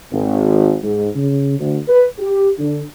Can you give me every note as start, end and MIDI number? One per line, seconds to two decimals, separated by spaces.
0.12 0.75 32
0.83 1.09 44
1.15 1.57 49
1.59 1.78 38
1.88 2.07 71
2.19 2.50 67
2.59 2.81 50